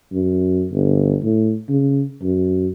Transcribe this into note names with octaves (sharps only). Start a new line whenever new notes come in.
F#2
G1
A2
C#3
F#2